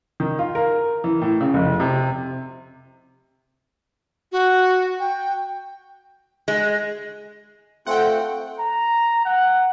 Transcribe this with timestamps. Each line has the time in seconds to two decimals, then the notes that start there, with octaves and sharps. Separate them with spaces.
0.20 D#3
0.39 F4
0.55 A#4
1.04 E3
1.22 A2
1.41 C#3
1.54 F1
1.80 C3
4.32 F#4
5.00 G5
6.48 G#3
7.87 A3 C4 F4 A4 F#5 G5
8.59 A#5
9.25 F#5